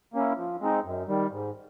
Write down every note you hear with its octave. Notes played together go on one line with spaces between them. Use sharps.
A#3 C#4 E4
F3
G#3 C4 D#4
F#2
D#3 G3
G#2